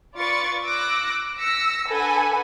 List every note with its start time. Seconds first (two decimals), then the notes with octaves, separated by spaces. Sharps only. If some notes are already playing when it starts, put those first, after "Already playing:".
0.16 F4 B4 D5 C#6 A6 C#7
0.65 D6 E6 F#6 A#6
1.39 E6 A#6 B6 C#7
1.89 D4 A4 B4 F#5 G#5